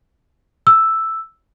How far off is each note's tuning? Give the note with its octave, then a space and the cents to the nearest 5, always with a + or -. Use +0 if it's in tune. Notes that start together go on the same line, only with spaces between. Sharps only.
E6 +0